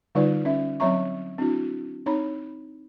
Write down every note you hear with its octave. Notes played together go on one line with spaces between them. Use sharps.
D3 G3 D#4 F4 B4 D5
C#4 E5
F#3 C4 C#5 E5 A#5 C#6
C4 D4 E4 F#4
C4 D#4 C#5 A#5 B5